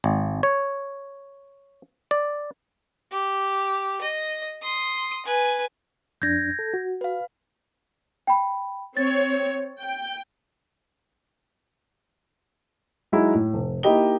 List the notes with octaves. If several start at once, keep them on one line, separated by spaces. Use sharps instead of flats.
G#1
C#5
D5
G4
D#5
C6 D#6
B4 G#5
F2 D4 G6 G#6 A#6
A4
F#4
B4 F5
G5 B5
C4 C#5 A6
G5
F#3 G#3 D#4 E4 F#4
A2
F1
A#3 D#4 E4 G4 D#5 G7